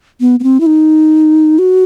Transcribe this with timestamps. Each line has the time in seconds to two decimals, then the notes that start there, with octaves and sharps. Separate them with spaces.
0.20 B3
0.40 B3
0.43 C4
0.60 E4
0.66 D#4
1.59 F#4